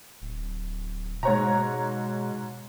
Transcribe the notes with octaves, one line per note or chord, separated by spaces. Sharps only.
D1
G#2 B2 C#5 A#5